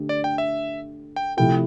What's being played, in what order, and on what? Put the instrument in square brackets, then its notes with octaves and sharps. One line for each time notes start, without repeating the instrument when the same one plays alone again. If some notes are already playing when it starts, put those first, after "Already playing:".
Already playing: [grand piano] D3 A3 D4 G4
[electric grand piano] D5
G5
E5
G5
[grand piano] C3 F3 A3 E4 G4 [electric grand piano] G5